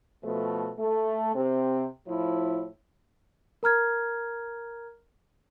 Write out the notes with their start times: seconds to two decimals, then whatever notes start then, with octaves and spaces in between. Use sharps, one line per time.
0.24 B2 F3 A3
0.79 A3
1.35 C3 C4
2.08 A2 F3 E4
3.63 A#4 A#5 F6 G#6